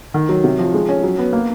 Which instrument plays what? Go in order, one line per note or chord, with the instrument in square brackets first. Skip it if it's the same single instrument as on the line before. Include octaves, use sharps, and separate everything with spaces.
[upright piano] D#3
F#3
C3
F3
G#3
C#4
F#3
B3
A#3